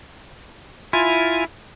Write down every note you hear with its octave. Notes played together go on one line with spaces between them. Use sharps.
E4 F4 G#5